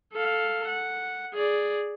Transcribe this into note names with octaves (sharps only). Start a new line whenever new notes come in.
A4 F5
F#5
G#4 D5